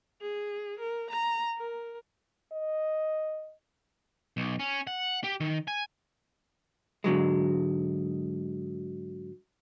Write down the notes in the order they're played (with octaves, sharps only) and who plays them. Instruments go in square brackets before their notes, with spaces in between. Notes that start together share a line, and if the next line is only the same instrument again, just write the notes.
[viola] G#4
A#4
A#5
A#4
[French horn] D#5
[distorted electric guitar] B1
C#4
F#5
G4
D#3
G#5
[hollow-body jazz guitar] G#2 D3 F#3 G#3